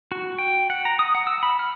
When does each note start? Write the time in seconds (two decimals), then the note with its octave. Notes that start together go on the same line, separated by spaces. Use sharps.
0.12 F#4
0.38 G5
0.70 F#5
0.85 A#5
0.99 D#6
1.15 F#5
1.27 E6
1.43 B5
1.59 F6